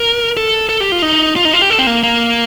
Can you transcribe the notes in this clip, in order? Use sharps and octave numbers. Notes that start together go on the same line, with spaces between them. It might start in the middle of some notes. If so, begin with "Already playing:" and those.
Already playing: A#4
A4
A4
G4
F4
D#4
F4
D#4
F4
G4
A4
C4
A#3
A#3